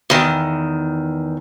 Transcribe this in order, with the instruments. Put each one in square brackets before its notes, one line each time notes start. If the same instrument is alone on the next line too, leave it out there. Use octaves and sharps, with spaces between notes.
[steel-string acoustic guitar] E2 D#3